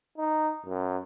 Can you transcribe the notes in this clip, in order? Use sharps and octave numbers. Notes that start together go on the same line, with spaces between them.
D#4
F#2